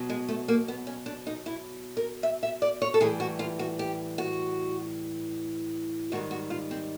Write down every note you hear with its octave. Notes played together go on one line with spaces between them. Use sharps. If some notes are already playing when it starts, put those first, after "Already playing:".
Already playing: B2 F#3
G#3
A3
A#3
B3
C#4
D4
D#4
E4
A#4
E5
E5
D5
C#5
A4
A2 E3 G3 G#4
F#4
F4
F#4
G4
F#4
G#2 D#3 G3 F#4
F#4
F4
C4